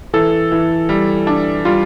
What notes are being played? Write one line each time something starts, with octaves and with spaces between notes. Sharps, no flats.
E3 A4
E3
G3
D4
G3 F4